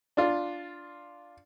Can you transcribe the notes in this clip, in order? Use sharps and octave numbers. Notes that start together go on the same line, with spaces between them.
D4 F4